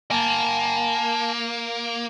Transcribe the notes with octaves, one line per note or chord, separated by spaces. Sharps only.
A#3 G#5 A5